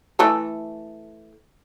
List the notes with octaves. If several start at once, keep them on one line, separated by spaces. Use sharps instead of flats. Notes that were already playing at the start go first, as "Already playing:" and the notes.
E3 A3 A4